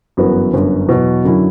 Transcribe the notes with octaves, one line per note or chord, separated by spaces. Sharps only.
G1 F#2 E3 B3 F#4
G1 F#2 D3
E2 B2 F#3
F#2 D3 F#3 C#4 E4